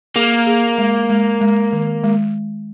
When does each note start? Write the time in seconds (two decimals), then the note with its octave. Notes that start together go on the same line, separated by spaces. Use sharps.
0.16 A#3 G#4
0.47 G#4
0.78 G#3
1.10 G#3
1.41 G#3
1.73 D#3
2.04 G#3